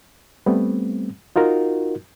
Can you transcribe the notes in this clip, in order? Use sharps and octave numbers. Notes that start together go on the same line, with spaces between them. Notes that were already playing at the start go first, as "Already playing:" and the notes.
G3 A3 B3 C4
D#4 F4 F#4 A#4